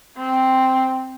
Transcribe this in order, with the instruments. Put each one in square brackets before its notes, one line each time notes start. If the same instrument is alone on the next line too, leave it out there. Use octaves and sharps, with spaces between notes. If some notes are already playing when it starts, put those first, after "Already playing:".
[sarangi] C4